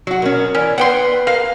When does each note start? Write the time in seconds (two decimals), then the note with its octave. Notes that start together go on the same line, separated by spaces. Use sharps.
0.07 F#3 F#4
0.22 B2 C#4 A#4
0.55 E3 C#4 D5
0.78 B3 B4 F#5 G5 C6
1.27 A#3 F5